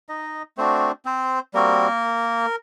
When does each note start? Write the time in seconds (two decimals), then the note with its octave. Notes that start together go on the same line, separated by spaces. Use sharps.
0.09 D#4 D#5
0.57 A3 C4 D4 F#4 C5
1.05 C4 C5
1.54 G3 A#3 C4 F#4 A#4